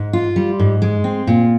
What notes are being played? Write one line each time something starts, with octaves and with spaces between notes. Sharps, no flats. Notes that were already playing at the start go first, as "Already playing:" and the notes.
Already playing: G#2
F4
G3
G#2
G#3
C4
A#2